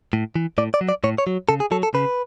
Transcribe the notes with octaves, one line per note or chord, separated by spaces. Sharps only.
A2
E3
A2 D5
D5
F#3
D5
A2 C#5
C#5
F#3
C#3 A4
G#4
F#3 A4
A4
C#3 B4